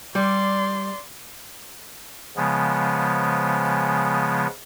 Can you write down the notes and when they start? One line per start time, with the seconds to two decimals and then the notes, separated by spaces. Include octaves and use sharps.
0.15 G3 D5 C6
2.36 C#3 F3 G#3 B3